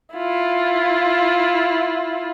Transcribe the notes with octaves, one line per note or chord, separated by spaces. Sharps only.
E4 F4